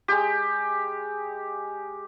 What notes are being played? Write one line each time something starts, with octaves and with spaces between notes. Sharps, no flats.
G#3 G4